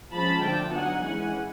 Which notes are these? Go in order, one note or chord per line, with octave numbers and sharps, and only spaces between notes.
F3 G#3 C#4 A5 B5
D3 F3 A3 D4 G5 A5
F#3 B3 D#4 F#5 G#5
E3 G#3 C#4 F#5 G#5